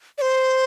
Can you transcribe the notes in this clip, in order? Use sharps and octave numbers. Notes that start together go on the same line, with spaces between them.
D5
C5